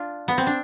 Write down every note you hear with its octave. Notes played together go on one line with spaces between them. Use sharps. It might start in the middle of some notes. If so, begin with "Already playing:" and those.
Already playing: D4 F4
B3
C4
D4